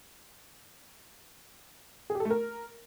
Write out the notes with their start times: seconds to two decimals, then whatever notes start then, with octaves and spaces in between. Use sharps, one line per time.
2.10 G#4
2.15 G4
2.20 A4
2.25 A3
2.30 A#4